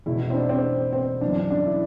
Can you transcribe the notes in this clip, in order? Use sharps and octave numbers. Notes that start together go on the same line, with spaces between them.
E1 E2 B2 E4
E4
C4
D4
C4
C4
G1 F#2 E3 D4
D4
D4
E4